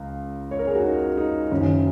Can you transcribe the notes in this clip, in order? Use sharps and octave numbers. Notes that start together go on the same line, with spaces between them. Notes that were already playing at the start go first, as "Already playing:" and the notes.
Already playing: C#2 C#3
C#5
A#4
G#4
F#4
D#4
D#4
F#1 F#2 D#3 C#4